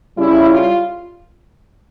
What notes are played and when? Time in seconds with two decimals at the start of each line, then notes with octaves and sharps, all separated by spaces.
0.17 C#3 G3 C#4 E4
0.49 F4